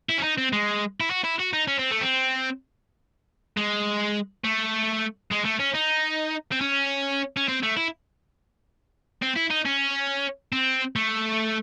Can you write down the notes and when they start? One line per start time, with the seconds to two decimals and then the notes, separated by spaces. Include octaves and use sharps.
0.09 E4
0.18 C#4
0.23 D#4
0.38 C4
0.53 G#3
1.00 E4
1.11 F#4
1.24 E4
1.40 F#4
1.53 D#4
1.68 C#4
1.79 C4
1.91 A3
2.01 C4
3.57 G#3
4.44 A3
5.31 G#3
5.45 A3
5.59 C#4
5.74 D#4
6.52 C4
6.61 C#4
7.37 C#4
7.48 C4
7.63 A3
7.76 E4
9.23 C4
9.36 E4
9.51 D#4
9.66 C#4
10.52 C4
10.96 A3